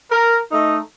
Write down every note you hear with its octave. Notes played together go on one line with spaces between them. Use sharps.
A#4
A3 D#4